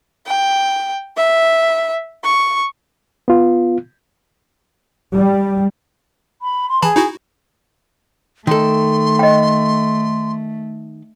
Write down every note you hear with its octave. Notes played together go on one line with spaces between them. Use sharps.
G5
E5
C#6
B3 F4
G3
B5
C6
E3 G#4 A5 B5
D#4 E4 F#4
D#3 A3 A4 C6
D#5 G5